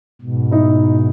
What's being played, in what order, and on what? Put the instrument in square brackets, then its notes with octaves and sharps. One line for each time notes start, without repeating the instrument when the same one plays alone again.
[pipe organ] G#2 B2
[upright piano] D#4 E4